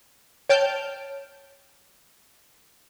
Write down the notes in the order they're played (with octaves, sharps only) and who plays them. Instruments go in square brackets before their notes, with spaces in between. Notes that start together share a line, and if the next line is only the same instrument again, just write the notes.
[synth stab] C#5 G5 A5 F6 G6